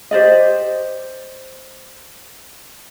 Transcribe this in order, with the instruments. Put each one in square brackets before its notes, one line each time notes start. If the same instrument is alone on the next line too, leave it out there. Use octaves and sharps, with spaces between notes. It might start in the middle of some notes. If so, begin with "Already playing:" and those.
[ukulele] G4 C5 D5 D#5